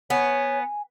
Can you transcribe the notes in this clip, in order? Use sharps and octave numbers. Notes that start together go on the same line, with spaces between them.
B3 C#5 G#5